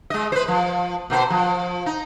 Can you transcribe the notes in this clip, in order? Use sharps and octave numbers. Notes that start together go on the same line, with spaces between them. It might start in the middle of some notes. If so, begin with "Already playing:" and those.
G#3 D#5
B4 C5
F3
B2 A#3 C5
F3
D#4